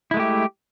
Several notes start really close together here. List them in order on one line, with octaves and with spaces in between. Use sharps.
E4 G#3 A3 G4